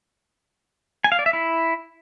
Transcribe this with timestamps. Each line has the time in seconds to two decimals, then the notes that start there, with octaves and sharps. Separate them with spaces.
1.04 G#5
1.12 F5
1.19 D5
1.26 E5
1.33 E4